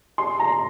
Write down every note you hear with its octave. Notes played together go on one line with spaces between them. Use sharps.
C6
A#5